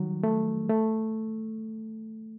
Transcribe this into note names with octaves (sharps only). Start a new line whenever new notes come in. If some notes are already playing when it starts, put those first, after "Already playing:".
Already playing: D#3 F#3 G3
A3
A3